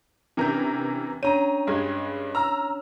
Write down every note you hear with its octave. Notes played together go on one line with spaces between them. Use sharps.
C3 E3 C#4 D4 A#4 G6
C#4 D4 C#5 A#5 D#7
G2 G#3 G#6
A#5 E6 F6